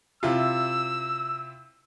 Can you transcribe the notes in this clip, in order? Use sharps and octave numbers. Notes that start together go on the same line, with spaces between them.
C3 E4 F4 E6